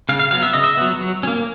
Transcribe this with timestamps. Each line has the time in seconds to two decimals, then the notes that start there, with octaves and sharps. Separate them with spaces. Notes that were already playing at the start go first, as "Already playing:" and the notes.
0.09 C#3 F5
0.19 F5
0.31 F#3 B3 F5
0.43 E5
0.53 C#3 D#5
0.64 E5
0.77 F#3 B3
1.01 F#3
1.23 C#4
1.27 A#3